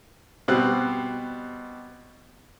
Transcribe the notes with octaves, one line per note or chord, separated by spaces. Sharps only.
B2 G3 C4 F#6